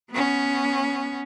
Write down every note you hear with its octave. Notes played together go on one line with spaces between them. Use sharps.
B3 C#4